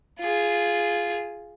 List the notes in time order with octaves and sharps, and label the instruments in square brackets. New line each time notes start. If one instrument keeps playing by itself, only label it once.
[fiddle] F4 G#4